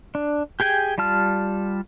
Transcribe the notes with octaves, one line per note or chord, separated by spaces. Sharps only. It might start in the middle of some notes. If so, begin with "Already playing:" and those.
D4
G4 G#4 G5 G#5
G3 F4 A5 F6